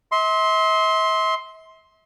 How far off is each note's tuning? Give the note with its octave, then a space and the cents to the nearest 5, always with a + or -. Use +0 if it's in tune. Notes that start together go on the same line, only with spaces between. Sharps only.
E5 -40 C6 +10